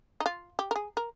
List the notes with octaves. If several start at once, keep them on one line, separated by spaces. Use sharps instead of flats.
D#4
F4
G4
A#4
G#4
A#4